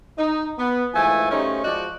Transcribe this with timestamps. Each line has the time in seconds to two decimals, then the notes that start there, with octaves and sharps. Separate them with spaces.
0.18 D#4
0.59 B3
0.94 G#2 E3 F3 A3 G#5
1.31 C#3 G3 A3 C#4 D#4 C5
1.64 F3 G#3 D#4 F#4 D5